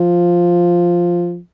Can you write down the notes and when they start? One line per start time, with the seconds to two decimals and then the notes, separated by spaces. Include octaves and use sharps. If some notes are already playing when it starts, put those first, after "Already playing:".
Already playing: F3